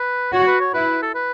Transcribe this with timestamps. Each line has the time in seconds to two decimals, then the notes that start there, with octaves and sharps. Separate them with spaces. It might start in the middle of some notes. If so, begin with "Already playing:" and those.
Already playing: B4
0.33 F#4 C#5
0.47 B4
0.60 C#5
0.74 E4 B4
1.03 A4
1.15 B4